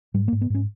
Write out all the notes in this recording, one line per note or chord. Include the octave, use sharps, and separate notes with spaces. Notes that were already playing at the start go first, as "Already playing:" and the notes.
G#2 G3
A#3
G#2
B3
G#2 C#4